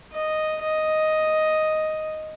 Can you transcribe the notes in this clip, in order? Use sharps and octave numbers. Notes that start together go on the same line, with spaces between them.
D#5
D#5